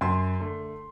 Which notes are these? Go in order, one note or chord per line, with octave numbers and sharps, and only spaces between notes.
F#2 C6
D3 A3